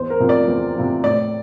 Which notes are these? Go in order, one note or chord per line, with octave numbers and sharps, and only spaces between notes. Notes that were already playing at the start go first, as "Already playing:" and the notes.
Already playing: E2 C5
A#4
C3 F3
D5
E2
C3 F3
A2 D5